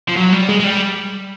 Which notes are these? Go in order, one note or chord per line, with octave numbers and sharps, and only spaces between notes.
F3
F#3
G3
G#3
G#3
G3